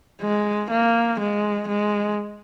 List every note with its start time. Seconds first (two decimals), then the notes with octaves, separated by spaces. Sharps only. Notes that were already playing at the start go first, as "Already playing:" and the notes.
0.22 G#3
0.70 A#3
1.20 G#3
1.68 G#3